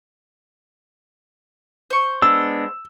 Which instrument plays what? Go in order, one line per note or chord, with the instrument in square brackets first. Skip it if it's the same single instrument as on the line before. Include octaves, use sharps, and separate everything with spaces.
[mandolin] C5 C#6
[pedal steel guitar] G#3 B3 D4 [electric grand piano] E6